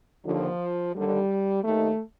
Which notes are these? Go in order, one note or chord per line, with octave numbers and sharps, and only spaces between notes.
D#2 D3 F3
D#2 D3 G3
D#2 D#3 A3